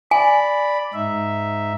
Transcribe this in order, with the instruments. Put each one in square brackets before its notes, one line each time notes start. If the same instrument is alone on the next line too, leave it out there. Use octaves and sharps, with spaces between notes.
[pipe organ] D5 B5 [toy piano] G#5
[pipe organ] G#2 D#4 E5